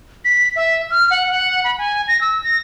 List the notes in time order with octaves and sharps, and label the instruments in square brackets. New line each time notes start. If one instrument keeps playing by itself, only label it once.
[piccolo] B6
E5
F6
F#5
F#5
B5
G#5
A#6
E6
A#6